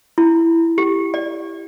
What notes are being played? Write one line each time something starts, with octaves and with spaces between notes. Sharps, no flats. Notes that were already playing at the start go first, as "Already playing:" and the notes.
E4
G4
D5